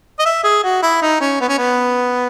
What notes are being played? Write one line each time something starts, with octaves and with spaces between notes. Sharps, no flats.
D#5
E5
G#4
F#4
E4
D#4
C#4
B3
C#4
B3